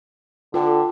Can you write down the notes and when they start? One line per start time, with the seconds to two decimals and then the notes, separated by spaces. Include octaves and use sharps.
0.54 D3 F4 A4 G5